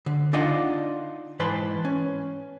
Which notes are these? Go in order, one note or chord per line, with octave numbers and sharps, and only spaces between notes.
D3
D4 D#4 F4 D5 D#5 F#5
G#2 E3 B4 A5 C6
C#4